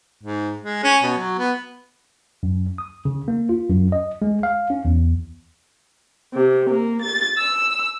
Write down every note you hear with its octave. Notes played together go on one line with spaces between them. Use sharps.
G#2
G#3
C#4
B2
F#3
B3
F#2
D#6
C#3
A#3
F4
F#2
D#5
G#3
F5
C#4
E2
C3
A#3
A6
E6